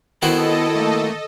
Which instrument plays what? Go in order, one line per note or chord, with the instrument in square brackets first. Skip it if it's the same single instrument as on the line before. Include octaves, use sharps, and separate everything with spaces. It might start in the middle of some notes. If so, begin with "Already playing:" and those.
[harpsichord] D#3 F#4 C5 [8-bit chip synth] B3 [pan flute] E4 [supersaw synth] A4 D#5
[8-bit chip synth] A3 A#3